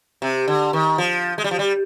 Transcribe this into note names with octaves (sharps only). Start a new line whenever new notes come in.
C3
D3
D#3
F3
G#3
G3
F3
G3